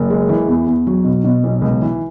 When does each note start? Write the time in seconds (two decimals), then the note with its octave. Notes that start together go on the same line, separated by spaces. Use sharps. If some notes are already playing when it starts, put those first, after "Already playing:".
Already playing: F#1
0.10 G#3
0.29 E3
0.48 E2
0.67 E2
0.87 F#3
1.05 B2
1.24 B2
1.44 B1
1.62 C#2
1.82 E3